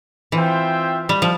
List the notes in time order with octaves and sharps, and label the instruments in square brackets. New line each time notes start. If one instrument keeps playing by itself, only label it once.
[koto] E3 [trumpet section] C4 F4 C5 E5 G5
[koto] G3
F3